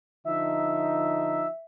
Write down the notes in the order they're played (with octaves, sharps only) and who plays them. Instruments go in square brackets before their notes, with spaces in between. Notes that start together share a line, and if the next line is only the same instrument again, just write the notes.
[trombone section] D3 F3 D#4 [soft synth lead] E5